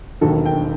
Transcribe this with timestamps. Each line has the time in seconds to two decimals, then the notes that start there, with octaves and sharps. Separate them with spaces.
0.21 E1 D#2 D#3 F#3 A4
0.46 G5